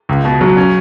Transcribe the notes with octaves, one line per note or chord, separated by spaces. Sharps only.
C#2
B2
F#3
C#4